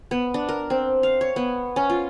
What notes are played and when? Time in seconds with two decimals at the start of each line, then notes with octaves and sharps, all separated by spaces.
0.11 B3
0.34 D4
0.49 A#4
0.70 C4
1.03 F5
1.21 C#5
1.36 B3
1.76 C#4
1.90 F4